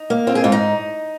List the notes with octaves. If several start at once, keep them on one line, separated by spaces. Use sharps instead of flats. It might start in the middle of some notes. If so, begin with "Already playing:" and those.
Already playing: D#4
A#3
C4 F4
G#4
G#2 F4
D#4